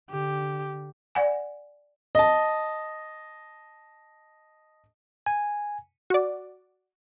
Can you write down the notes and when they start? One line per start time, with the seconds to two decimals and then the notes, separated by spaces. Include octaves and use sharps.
0.10 D3 G4
1.15 D5 F#5 G#5
2.15 D#5 A5
5.26 G#5
6.10 F#4 D5